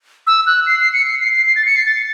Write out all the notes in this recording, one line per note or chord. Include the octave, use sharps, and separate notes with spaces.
E6
F#6
C7
C7
C#7
C7
C7
C7
C7
A6
C#7
C7
A6